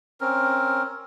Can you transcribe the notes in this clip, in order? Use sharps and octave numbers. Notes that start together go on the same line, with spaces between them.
C4 C#4 A#4